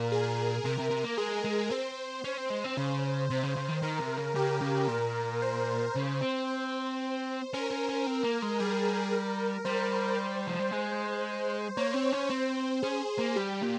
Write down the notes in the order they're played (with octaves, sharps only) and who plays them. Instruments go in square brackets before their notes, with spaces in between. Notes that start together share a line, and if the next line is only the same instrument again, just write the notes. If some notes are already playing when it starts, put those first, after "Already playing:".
Already playing: [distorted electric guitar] A#2 [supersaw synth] A#4
[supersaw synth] G#4
[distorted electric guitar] C3 [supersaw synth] A#4
[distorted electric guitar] C3
C3
A#3
[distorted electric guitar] G#3 [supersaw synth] G#4
[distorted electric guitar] G#3
[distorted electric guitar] C4 [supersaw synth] C5
[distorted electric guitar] C#4 [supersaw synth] C5
[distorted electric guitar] C4
G#3
C4
[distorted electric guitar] C#3 [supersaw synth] C5
[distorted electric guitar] C3 [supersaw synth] C5
[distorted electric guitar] C#3
C#3
D#3
[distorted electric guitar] D#3 [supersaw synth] A#4
[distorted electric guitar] C3
C#3
[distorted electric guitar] C#3 [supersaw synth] G4
[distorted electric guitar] C#3
[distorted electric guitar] A#2 [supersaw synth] A#4
[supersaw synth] C5
[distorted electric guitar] C#3
C4
[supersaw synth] C5
[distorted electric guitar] C#4 [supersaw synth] A#4
[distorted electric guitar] C#4
C#4
C4
A#3
G#3
[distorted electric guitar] G3 [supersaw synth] G#4
[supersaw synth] A#4
[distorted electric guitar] G3 [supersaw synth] C5
[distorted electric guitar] F3
G3
G#3
[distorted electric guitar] A#3 [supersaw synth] C#5
[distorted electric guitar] C4
C#4
[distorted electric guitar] C4 [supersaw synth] C5
[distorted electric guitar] C#4 [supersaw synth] G#4
[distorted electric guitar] A#3
[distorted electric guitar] G3 [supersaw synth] G4
[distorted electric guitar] A#2